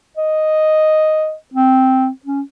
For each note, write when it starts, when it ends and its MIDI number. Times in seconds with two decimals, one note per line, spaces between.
0.17 1.34 75
1.54 2.09 60
2.25 2.41 61